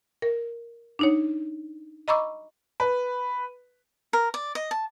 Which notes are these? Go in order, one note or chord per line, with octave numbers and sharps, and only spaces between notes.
A#4
D4 D#4 C#5
D#5 A#5 B5 C#6 D6 E6
B4
A#4
D5
D#5
A5